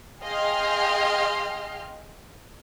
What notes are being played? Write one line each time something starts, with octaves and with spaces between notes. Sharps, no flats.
G#4 D#5 F5 G5 C6 F6